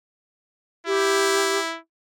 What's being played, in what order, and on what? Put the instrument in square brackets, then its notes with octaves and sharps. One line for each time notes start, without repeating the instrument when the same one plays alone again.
[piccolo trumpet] E4 [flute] G4